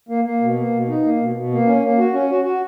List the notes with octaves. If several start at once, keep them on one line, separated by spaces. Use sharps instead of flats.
A#3
A#3
B2
A#3
B2
D#4
A#3
B2
B2
A#3
C#4
A#3
F#4
C#4
F#4
F#4